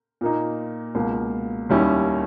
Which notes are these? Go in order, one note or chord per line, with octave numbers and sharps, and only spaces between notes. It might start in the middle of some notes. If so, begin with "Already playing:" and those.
A#2 A#3 D#4
C#2 B2 A#3
D#2 D#3 G3 C#4 E4